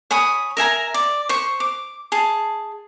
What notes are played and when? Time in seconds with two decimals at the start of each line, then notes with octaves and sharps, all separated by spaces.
0.11 C#5 G#5 B5 D#6
0.57 A#4 E5 G#5 A#5
0.94 D5
1.29 C5 C#6
1.60 D6
2.12 G#4 A5